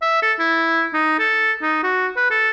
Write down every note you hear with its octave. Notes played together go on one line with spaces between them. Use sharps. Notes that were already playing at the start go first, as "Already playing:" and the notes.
E5
A4
E4
D#4
A4
D#4
F#4
B4
A4